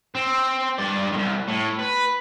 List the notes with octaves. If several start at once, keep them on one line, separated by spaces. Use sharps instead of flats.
C4
G2 D5
C2 G#2
A2
B4